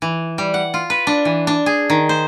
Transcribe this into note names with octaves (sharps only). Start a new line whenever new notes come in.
E3
G3
F#5
F4
B4
D4
E3
D4
G#4
D#3
C5